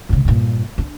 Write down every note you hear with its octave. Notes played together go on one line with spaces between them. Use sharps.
G#2 C#3
G2 A#2
D4